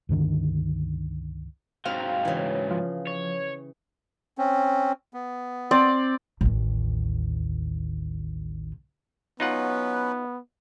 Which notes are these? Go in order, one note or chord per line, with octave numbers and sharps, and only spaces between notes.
C#2 G2 D3 D#3
G#2 F#3 C4 F5
C#3 E3
F3
C#5
C4 C#4
B3
C4 D5
A1 D#2
F#3 B3 C#4 D#4 F4 B4 F#5